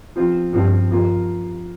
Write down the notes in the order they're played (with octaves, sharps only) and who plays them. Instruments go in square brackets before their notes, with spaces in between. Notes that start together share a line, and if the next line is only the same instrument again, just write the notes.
[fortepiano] F3 C4 F4
[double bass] G2 [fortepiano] F3 C4 F4
[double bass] G2 [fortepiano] F3 A#3 F4